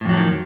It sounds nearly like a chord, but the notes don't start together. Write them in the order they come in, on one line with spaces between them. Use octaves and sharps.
A2 F2 F#3 F3 D#3